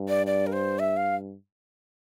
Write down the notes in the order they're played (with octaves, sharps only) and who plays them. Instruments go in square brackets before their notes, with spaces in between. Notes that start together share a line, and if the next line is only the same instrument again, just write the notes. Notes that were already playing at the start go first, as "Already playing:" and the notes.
Already playing: [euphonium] G2
[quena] D5
D5
A#4
C5
E5
F5